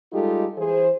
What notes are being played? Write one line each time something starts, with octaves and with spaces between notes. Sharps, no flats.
G3 G#3 D#4 F4 G4 A4
E3 G#4 C5